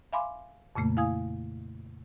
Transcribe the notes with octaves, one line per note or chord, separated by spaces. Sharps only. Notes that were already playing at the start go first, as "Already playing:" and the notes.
E5 F5 G#5 B5 C6 D6
F2 A#2 C#3 A3 A#3
E4 F5 G#5 D#6 G#6